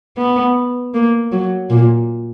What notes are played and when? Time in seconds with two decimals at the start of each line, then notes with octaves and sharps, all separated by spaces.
0.18 B3
0.94 A#3
1.32 F#3
1.70 A#2